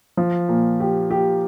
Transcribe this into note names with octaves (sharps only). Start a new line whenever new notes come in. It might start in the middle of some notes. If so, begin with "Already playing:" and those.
F3
A#2
G4
G4